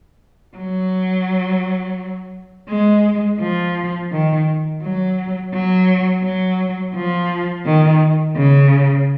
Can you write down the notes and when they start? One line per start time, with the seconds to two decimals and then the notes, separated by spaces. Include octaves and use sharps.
0.57 F#3
2.69 G#3
3.40 F3
4.12 D#3
4.82 F#3
5.53 F#3
6.24 F#3
6.95 F3
7.66 D#3
8.36 C#3